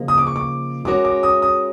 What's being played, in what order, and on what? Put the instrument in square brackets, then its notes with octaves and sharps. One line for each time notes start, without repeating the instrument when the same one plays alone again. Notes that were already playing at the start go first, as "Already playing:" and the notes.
Already playing: [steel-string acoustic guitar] C#3 F3 A#3 D#4
[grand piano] D#6
D6
C#6
D6
[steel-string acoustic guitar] G#3 C#4 F#4 A#4 C#5 [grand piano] D6
[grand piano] D6
D#6
D#6